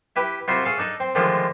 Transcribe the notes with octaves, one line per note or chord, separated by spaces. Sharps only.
E4 G4 B4
C2 F4 F#4 C5 E5 B5
G#4 A4 F5 C#6
D4 D#4 A4
C4
D3 D#3 F3 G#3 A3